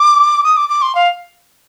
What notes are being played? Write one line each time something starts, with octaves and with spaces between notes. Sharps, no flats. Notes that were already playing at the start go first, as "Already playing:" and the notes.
Already playing: D6
D#6
D6
D6
C6
F5